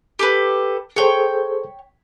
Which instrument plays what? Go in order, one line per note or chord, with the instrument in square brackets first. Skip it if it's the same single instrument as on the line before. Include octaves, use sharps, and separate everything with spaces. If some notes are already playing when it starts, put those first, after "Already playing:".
[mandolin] G4 A4 B4
[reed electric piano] G#4 A4 C5 [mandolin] C#5 G5